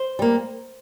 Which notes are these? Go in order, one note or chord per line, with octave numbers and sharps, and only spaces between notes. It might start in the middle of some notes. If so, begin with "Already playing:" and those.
Already playing: C5
G3 A#3